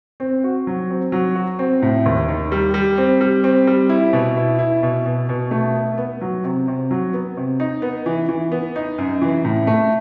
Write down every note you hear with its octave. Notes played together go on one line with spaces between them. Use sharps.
C4
F#4
F#3
C4
F#3
F#4
C4
A2
D#2
D#3
G3
G3
C4
G3
C4
G3
E4
B2
E4
E4
B2
B2
B2
A3
B3
B3
F#3
C3
C3
F#3
B3
C3
D#4
B3
E3
E3
B3
D#4
F#2
E3
A2
A3